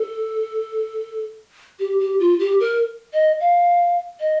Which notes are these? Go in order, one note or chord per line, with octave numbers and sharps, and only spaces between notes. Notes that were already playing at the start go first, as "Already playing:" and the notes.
Already playing: A4
G4
G4
F4
G4
A#4
D#5
F5
D#5